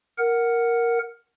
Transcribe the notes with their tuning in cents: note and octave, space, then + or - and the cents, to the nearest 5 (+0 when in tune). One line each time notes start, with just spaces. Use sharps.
A#4 +0 F#5 +0